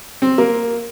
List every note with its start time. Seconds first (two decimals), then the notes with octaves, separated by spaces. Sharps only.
0.22 C4
0.38 A#3